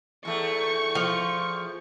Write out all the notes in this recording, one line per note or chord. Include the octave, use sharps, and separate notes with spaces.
E2 A3 C#6
F3